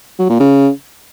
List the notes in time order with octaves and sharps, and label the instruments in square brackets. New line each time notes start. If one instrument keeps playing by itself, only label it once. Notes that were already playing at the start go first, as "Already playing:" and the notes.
[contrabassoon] F#3
A#2
C#3